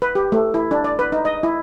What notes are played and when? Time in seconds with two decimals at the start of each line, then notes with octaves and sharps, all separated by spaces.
0.02 B4
0.15 G4
0.32 A3
0.54 E4
0.71 D4
0.84 D5
0.99 B4
1.12 D#4
1.25 D#5
1.43 E4